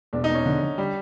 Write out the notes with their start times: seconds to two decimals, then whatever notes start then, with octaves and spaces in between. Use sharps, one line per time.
0.13 E1 D4
0.24 D#4
0.30 E1
0.35 C#4
0.45 D3
0.63 D3
0.78 G3